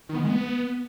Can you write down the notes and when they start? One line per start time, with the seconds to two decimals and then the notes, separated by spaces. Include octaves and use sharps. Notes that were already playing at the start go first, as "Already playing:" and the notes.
0.09 D#3
0.14 B3
0.19 D#3
0.25 G#3
0.30 B3